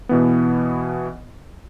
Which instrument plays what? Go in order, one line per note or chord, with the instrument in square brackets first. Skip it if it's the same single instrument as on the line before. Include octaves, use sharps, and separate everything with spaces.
[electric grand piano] B2 E3 B3